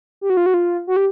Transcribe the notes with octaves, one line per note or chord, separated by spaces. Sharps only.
G4
F#4
F4
F#4
F4
F#4
G4